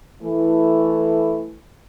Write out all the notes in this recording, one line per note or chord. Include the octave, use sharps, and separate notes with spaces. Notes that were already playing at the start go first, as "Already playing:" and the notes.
E3 A3